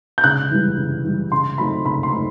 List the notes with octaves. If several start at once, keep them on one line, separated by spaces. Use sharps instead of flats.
G6
C#3 F#6
E3 G3
C#3
E3 G3
C#3 C6
F#3 A3 C4 D#4 B5
C#3 B5
C6
F#3 A3 C4 D#4